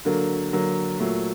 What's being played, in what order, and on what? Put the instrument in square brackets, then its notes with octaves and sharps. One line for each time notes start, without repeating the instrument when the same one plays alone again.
[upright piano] D3 F#3 A#3
D3 F#3 A#3
A#2 F#3 A3